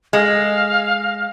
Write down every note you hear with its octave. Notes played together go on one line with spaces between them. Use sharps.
G#3 F5